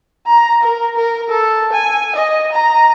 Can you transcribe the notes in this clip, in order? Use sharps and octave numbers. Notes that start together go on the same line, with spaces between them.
A#5
A#4
A#4
A4
G#5
D#5
A#5